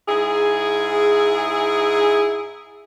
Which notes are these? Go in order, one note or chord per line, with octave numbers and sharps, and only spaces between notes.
G#2 E4 G#4